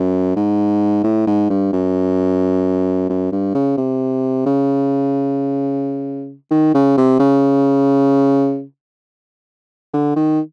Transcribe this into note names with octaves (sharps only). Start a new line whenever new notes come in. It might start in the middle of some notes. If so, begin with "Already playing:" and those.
Already playing: F#2
G#2
A2
G#2
G2
F#2
F#2
G2
C#3
C3
C#3
D#3
C#3
C3
C#3
D3
D#3